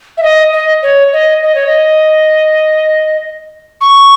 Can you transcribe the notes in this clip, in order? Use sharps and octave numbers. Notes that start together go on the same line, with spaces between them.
E5
D#5
D#5
C#5
D#5
D#5
C#5
D#5
C#6